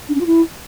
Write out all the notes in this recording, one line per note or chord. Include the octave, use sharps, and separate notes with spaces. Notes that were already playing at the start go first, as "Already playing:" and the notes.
D4
C#4
F4
E4